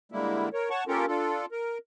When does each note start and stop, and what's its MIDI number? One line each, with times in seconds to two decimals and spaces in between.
0.12 0.49 50
0.12 0.49 55
0.12 0.49 56
0.12 0.49 58
0.12 0.49 64
0.53 0.69 70
0.53 0.69 73
0.70 0.84 73
0.70 0.84 78
0.70 0.84 81
0.70 0.84 85
0.88 1.06 58
0.88 1.06 61
0.88 1.06 65
0.88 1.06 67
0.88 1.06 69
0.88 1.06 70
1.08 1.46 62
1.08 1.46 65
1.08 1.46 69
1.52 1.78 70